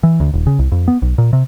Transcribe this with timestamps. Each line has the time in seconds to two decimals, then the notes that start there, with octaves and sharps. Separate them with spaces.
0.03 E3
0.20 D2
0.34 D#1
0.47 C#3
0.59 C2
0.72 F2
0.88 B3
1.02 B1
1.18 A#2
1.33 C3